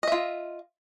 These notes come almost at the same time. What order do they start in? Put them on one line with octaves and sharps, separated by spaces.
D#5 E5 F4